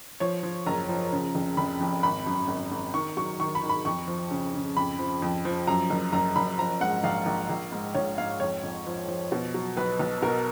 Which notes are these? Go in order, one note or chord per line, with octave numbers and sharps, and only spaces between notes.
F3 C#5
F3
F#1 A#5
F3
C#3
F1
F1 B5
F2
G#1 B5
F#2
G#1
G#1
D#3 C#6
F#3 C#6
D#3 C#6
B5
D#3
B5
F2 C#6
F3
C#3
C#3
F2 B5
F3
F2
F3
F#2 A#5
F#1
F#1 A#5
F#1 B5
F3 A#5
G#2 F#5
A#1 F5
A#1
A#1
G#2
A#1 C#5
G#2 F5
F2 C#5
F2
F3
F3
B2
F#3
B1 B4
B1
B2 A#4